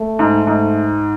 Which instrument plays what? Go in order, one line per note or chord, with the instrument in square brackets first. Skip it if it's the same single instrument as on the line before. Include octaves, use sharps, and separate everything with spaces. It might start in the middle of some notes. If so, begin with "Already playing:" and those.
Already playing: [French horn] A3
[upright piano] G#2
G#2